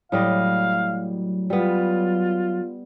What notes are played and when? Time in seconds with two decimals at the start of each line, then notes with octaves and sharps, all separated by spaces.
0.12 A2 F#3 G3 D#5 F5
1.50 G3 B3 F4